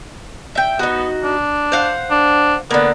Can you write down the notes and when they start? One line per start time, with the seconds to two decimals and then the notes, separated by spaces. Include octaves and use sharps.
0.55 E5 G5
0.79 B3 D#4 F#4
1.24 D4
1.72 C5 F5 F#5
2.11 D4
2.71 D3 A#3 B3